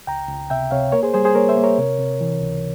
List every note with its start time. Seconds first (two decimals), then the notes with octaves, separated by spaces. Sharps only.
0.07 C#2 G5 A#5
0.29 C#2
0.50 C3 E5 G5
0.71 C3 C#5 F5
0.92 A#3 A#4 C#5
1.03 G#4 C5
1.14 G3 G#4 C5
1.25 G#4 C5
1.35 A#3 A#4 C#5
1.49 C5 E5
1.57 A#3
1.63 A#4 C#5
1.78 C3
1.99 C3
2.21 E3
2.42 C#2